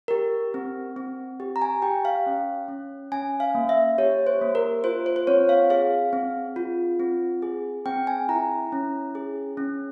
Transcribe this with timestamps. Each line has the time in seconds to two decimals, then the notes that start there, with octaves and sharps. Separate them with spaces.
0.08 G4 A#4
0.54 C4
0.96 C4
1.40 G4
1.56 A#5
1.62 G#5
1.82 G4 G5
2.05 F5
2.26 C#4
2.68 C#4
3.12 C#4 G#5
3.40 F5
3.55 A#3
3.69 E5
3.98 G4 C#5
4.27 C5
4.41 A#3
4.55 A#4
4.84 F4 C5
5.06 C5
5.16 C5
5.27 C4 C#5
5.49 F5
5.70 G#4 F5
6.13 C4
6.56 F4
6.99 C4
7.42 G#4
7.86 C4 G5
8.07 G#5
8.29 E4 A#5
8.72 C#4
9.15 G#4
9.57 C#4